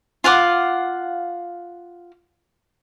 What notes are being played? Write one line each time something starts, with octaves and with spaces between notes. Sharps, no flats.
F4 F5 F#5 D6